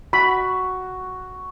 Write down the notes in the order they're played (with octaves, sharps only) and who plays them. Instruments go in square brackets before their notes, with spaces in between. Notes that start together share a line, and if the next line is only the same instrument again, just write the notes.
[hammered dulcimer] F#4 [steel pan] B5